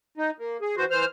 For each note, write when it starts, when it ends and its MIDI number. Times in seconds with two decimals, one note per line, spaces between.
0.18 0.30 63
0.39 0.57 58
0.61 0.75 68
0.77 0.85 52
0.77 0.85 66
0.77 0.85 72
0.91 1.05 52
0.91 1.05 72
0.91 1.05 89